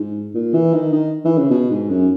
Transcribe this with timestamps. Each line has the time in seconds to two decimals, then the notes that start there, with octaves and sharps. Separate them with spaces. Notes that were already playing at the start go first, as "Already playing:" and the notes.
Already playing: G#2
0.35 A#2
0.54 E3
0.74 D#3
0.93 D#3
1.25 E3
1.38 C#3
1.51 B2
1.71 G#2
1.90 F#2